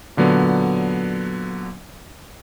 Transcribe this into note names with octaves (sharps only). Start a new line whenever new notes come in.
A#2 D3 F#3 B3